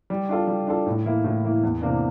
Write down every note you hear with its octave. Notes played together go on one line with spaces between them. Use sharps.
G3
D4 F4 A4
G3
D4 F4 A4
A2
E3 A#3 E4
A2
E3 A#3 E4
E2
C3 E3 A#3 D4